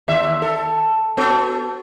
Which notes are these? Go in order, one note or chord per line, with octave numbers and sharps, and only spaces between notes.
D#2 E5
A4
B3 F#4 A4